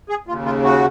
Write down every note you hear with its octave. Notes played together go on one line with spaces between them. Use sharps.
G#4
D#2 C#3 F4
F4
F#4